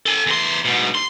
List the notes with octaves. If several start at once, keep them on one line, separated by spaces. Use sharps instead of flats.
A4 G#5
E2 C6
G#2 B2
C6